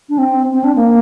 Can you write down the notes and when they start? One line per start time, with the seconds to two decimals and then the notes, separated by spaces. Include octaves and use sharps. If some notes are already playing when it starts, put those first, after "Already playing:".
0.09 D4
0.18 C4
0.53 C4
0.64 D4
0.76 A#3